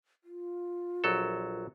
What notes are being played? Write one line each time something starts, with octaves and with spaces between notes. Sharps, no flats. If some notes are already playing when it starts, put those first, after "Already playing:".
F4
A#1 F#3 A4